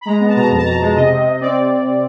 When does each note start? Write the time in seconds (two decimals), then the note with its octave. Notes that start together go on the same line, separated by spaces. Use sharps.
0.01 B5
0.05 G#3 A#5
0.20 B3
0.28 A5
0.36 B2 A#5
0.43 A5
0.50 F2 A#5
0.57 A5
0.65 F2 A#5
0.72 A5
0.81 G#3
0.96 C3 D#5
1.11 C3
1.26 C3
1.41 C4 D5